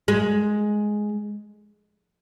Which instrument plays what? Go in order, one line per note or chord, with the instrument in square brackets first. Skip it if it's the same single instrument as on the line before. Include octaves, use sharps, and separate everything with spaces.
[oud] G#3